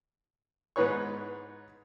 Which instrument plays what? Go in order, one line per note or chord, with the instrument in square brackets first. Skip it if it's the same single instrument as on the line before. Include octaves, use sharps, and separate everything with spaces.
[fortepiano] G#2 B3 D#4 B4 C#5 C#6